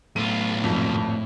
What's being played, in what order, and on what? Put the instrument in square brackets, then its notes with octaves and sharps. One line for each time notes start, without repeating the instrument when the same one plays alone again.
[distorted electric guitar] B1 F4 [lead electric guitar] A2 [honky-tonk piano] D#7
[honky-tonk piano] G#1 F2